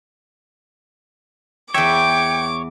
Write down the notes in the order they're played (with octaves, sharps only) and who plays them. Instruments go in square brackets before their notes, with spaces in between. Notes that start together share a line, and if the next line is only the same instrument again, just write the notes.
[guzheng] E2 E5 [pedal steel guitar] C#5 [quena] G5 [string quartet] D6